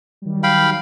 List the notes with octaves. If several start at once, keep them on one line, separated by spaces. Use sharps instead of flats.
D#3 F#3 G3
F5 G5 B5